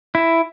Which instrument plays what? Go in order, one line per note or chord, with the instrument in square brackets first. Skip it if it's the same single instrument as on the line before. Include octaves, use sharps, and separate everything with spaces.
[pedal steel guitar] E4